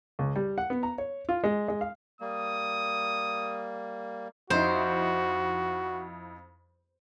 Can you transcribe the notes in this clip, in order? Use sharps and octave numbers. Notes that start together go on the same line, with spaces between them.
C#2
G3
F#5
B3
A#5
C#5
F4
G#3
G#3
F5
G3 A#3 D#6
F2 D#4 E4 F#4 C5